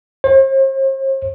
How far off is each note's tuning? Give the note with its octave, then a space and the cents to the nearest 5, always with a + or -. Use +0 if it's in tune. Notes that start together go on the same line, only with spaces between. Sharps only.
C5 +45